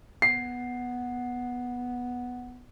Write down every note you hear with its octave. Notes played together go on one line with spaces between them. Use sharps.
B3 C7